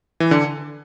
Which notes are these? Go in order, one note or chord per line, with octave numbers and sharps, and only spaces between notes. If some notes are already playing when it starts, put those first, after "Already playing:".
E3
D3